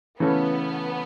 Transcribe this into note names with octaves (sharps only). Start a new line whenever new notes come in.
C#3 E3 A3 B3 C#4 A4